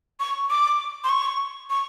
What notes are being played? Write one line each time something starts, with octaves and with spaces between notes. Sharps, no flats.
C#6
D6
C6
C#6
C#6